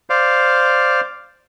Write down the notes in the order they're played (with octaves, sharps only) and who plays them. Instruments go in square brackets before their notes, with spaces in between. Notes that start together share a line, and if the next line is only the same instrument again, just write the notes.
[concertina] C5 D5 F5